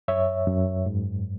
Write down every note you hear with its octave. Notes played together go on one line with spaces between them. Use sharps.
F#2 C#5 E5
F#2
G#2